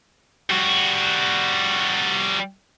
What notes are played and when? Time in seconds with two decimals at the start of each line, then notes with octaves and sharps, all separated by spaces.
0.50 G3 F#4